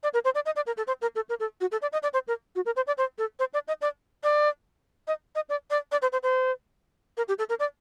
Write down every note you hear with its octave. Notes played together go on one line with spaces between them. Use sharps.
D5
A#4
C5
D5
D#5
D5
A#4
A4
C5
A#4
A4
A#4
A4
F#4
A4
D5
D#5
D5
C5
A#4
F#4
A#4
C5
D5
C5
A4
C5
D5
D#5
D5
D5
D#5
D#5
D5
D5
D5
C5
C5
C5
A#4
G4
A4
A#4
D5